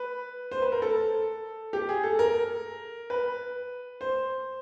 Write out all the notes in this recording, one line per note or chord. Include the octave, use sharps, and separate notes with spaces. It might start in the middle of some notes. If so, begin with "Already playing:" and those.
Already playing: B4
C5
B4
A#4
A4
G4
G#4
A4
A#4
B4
C5